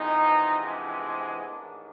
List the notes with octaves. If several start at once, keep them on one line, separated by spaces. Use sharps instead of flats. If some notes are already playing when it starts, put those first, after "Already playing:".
Already playing: F2 C3 E3 G#3 B3 D#4
D4
A1 G#2 D#3 D4